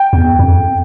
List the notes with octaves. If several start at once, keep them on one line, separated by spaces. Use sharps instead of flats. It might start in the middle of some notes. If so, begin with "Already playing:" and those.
Already playing: G5
E2
F2